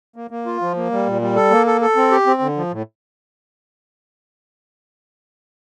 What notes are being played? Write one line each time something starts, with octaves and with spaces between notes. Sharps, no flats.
A#3
A#3
F4
F3
A#3
G3
A#2
G3
A4
A#3
A4
A4
C4
G4
C4
D3
F3
A2